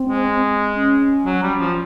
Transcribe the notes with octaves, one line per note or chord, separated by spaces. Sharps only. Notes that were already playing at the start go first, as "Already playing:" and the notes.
Already playing: C4
G#3
C#4
F#3
G3
F3